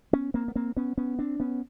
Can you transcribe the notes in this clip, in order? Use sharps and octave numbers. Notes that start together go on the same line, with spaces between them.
B3 C#4
A#3 C4
B3
A#3 C4
B3 C#4
B3 C#4
C4 D4
B3 C#4